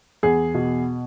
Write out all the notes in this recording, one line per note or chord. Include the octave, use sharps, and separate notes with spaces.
E2 G#4
B2